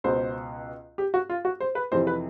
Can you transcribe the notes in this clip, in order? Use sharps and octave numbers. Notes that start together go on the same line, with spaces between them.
C#2 B2 C5
G4
F#4
F4
F#4
C5
B4
F2 C3 E3 C5
B4